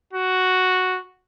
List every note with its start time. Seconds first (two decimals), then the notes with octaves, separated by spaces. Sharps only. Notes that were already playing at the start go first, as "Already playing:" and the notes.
0.13 F#4